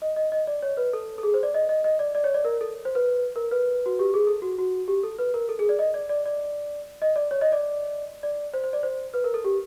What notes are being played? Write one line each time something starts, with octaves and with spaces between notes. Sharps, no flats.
D#5
D#5
D#5
D5
C#5
B4
A4
A4
G#4
C5
D5
D#5
D#5
D#5
D5
D5
C#5
D5
A#4
A4
C5
B4
A#4
B4
F#4
G4
G#4
A4
F#4
F#4
G4
A4
B4
A#4
A4
G#4
D5
D#5
D5
D5
D5
D#5
D5
C#5
D#5
D5
D5
C5
C5
D5
C5
B4
A#4
A4
G4